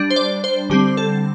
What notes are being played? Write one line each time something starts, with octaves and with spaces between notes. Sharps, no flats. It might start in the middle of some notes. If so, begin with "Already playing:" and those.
Already playing: G3 D4
C5
D5
C5
D3 G3 C4 G4
A4